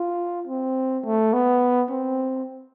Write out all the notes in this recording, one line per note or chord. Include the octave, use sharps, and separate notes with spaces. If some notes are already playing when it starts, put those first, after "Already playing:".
Already playing: F4
C4
A3
B3
C4